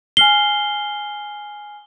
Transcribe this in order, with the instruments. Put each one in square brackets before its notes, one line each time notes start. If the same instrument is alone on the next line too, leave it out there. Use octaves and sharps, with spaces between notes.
[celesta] G#5 F6 C7 [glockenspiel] G7